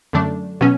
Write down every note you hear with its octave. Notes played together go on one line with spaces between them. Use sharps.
F#2 D3 A3 D4
B2 F#3 C#4